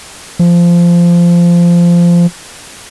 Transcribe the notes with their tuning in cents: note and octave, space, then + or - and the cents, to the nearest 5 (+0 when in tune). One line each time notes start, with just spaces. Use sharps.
F3 -15